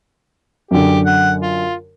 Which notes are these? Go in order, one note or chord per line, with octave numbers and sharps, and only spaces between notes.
F#2 D3 G4
F#5
F4